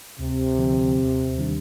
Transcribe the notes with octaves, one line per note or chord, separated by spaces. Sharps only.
D2 C3
D3 F3 C4
D#2
D#3 G3 D4 G4